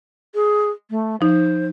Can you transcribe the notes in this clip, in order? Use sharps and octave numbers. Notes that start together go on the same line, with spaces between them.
G#4
A3
F3 D#4 C5